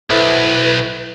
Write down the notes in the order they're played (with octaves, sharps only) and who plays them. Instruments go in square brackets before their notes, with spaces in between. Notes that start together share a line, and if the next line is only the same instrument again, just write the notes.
[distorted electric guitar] B1 [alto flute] E4 [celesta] A4 C5 E5 [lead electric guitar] B4